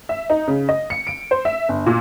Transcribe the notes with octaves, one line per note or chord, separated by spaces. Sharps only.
E5
D#4
C#3
D#5
C#7
D7
C5
E5
G1
A#2